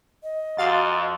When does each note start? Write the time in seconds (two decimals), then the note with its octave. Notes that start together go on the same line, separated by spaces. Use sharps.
0.23 D#5
0.58 F2 F#4 F5 A6